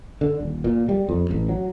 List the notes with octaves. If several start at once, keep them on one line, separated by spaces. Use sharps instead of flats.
D3
D#1
A#2
G3
F2
A1
F#3